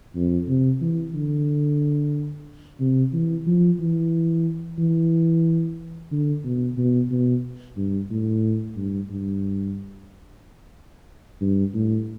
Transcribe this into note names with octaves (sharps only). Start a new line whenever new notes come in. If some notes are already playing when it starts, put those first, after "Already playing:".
F2
C3
E3
D3
C3
E3
F3
E3
E3
D3
B2
B2
B2
G2
A2
G2
G2
G2
A2